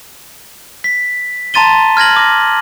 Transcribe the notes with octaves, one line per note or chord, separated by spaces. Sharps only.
B6
A5 A#5 C6 A6 D#7 G7
F6 G#6 A#6 F#7
D6 A#6